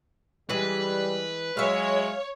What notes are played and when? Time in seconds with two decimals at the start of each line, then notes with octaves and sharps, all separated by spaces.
0.49 E3 G3 G#3 B4
1.57 F#3 G#3 C#5 E5 F5